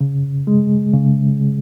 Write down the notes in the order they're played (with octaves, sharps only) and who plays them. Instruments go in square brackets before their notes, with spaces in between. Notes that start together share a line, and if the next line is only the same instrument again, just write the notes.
[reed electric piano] C#3
G#3
C#3